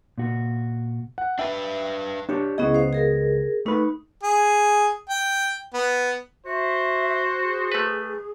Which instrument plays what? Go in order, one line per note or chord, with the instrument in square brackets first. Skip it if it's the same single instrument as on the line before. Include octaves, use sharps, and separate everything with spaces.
[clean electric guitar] A#2 F#4
[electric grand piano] F#5
[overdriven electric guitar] D4 B4 [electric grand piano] E5 G5
[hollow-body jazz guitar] D4 G4 C#5
[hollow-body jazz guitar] C#2 B3 D#5 [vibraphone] C#4 E4 G#4
[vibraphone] C5 F5
G#4 A#4
[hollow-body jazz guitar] A3 B4 [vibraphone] D#4
[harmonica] G#4
G5
B3
[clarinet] F#4 [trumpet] C5 [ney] E5
[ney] G#4
[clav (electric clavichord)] A3 B4